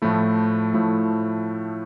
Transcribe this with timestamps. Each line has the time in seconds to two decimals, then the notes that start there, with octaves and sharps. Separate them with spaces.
0.02 A2 F3 A3 E4
0.74 A2 F3 A3 E4